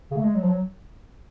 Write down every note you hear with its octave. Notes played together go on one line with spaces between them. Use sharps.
C#3
A3
G#3
F#3
F3
F#3